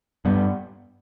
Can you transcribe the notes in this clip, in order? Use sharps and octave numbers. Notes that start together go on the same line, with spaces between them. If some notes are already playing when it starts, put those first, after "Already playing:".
G2 G3 B3